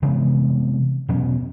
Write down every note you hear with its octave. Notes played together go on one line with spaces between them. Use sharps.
C3 E3 G#3 B3
E2 B2 F#3 C#4